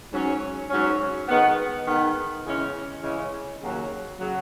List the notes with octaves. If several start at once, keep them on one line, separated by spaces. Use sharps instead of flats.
G#2 F#3 C#4
G#2 F#3 C#4
D#3 G#3 B3
D#3 G#3 B3
C#3 E3 G#3 C#4
C#3 E3 G#3 C#4
D#2 C#3 F#3
C#3 F#3